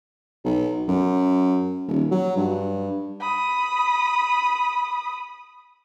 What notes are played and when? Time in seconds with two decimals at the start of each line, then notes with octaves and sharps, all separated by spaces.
0.44 B1
0.88 F#2
1.88 D#1
2.11 F#3
2.36 G2
3.20 B5 D#6